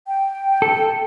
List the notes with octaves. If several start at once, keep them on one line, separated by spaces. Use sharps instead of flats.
G5
A4